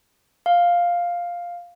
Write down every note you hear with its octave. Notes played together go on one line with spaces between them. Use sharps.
F5